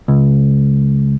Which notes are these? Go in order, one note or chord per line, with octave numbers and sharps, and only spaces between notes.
C#2